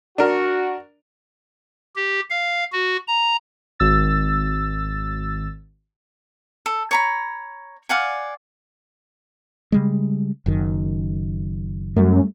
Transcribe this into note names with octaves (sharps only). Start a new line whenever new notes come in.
D4 F#4 A#4
G4
F5
F#4
A#5
G#1 E6 A6
A4
C#5 A#5 B5
D5 F5 F#5 G#5
C#3 G3 G#3
F#1 F#2 D#3
F#2 G3 A3